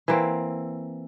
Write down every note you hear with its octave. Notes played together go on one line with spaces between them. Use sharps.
E3 A#3 C4